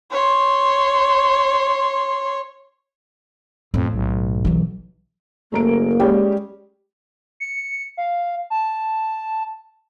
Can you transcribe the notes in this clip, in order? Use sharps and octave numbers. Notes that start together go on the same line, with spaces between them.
C#5 C6
F2 A2
B1
E3 F#3
F#1 A3 A#3 A#5 D7
G3 G#3 C#4 G4
C#7
F5
A5